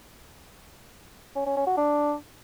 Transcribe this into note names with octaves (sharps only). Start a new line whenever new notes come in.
C#4
C#4
C#4
F#4
D4